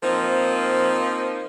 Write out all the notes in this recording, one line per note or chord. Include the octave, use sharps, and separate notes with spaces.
F3 A#3 C4 D#4